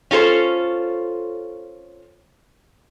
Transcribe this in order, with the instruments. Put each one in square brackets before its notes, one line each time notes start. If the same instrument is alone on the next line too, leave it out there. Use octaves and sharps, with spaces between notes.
[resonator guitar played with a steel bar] C#4 F4 A4 C5